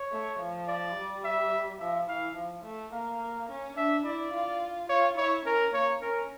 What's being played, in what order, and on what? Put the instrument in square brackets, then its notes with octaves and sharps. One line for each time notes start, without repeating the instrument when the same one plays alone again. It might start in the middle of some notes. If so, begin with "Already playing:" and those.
Already playing: [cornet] C#5
[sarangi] A3
F3
[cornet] D5
[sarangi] G3
[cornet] E5
[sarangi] F3 [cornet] E5
[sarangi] E3 [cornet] F5
[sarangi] F3
A3
[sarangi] A#3 [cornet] F5
[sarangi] C#4
[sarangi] D4 [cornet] E5
[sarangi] E4 [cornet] D5
[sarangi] F4
[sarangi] F4 [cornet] C#5
[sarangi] E4 [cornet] C#5
[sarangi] C#4 [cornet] A#4
[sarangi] A#3 [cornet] C#5
[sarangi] C#4 [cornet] A#4